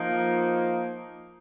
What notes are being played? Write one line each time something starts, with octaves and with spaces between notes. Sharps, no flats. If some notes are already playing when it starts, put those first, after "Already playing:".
Already playing: F3 A#3 D#4